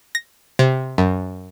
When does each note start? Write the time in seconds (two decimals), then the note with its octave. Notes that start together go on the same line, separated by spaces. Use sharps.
0.15 A#6
0.59 C3
0.98 F#2